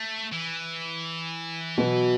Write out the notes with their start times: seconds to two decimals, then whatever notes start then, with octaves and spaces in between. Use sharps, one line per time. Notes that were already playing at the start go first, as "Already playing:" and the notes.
Already playing: A3
0.33 E3
1.78 B2 F#3 B3